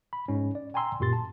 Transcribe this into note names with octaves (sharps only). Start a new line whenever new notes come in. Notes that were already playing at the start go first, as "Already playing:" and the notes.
B5
G#2 C#4
D5
G5 G#5 A#5 C6 E6
F#2 A#2 G4 C6 A6
A5